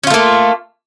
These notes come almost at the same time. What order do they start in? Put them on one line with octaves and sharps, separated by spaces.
C#4 F4 A3 A#3